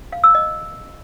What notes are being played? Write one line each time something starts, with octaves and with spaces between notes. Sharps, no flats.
F5
E6
D#5